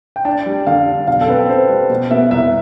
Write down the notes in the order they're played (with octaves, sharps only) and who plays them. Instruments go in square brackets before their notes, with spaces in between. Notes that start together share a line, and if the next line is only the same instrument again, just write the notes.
[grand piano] G5
[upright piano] D4 [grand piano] A5
[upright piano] G3
[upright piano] D3 [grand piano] F5
[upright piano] D4
[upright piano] B1 [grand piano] F5
[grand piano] A4
[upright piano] C4 [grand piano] B4
[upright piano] C4 [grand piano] C5
[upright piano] G3
B2
[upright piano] B3 [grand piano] E5
[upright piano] C2 [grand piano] E5